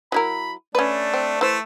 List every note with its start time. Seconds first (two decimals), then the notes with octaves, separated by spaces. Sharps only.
0.12 F#3 E4 A#4 B5
0.75 A3 C#4 D4 B4
1.14 C4
1.41 E3 A3 C5 E6